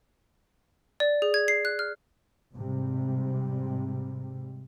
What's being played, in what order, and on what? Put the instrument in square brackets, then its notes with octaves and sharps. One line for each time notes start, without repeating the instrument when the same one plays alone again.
[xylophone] D5
G#4
G#6
C7
F#6
F6
[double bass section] G#2 C3 G3